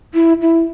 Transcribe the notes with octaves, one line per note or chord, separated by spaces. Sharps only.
E4
E4